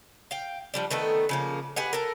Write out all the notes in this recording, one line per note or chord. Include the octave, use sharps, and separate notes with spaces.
F5 G5
F3 G3 D4
D#3 A3 B3 A4
C#3 F3 A#3
G4 G#4 B4 F#5
A4 A#4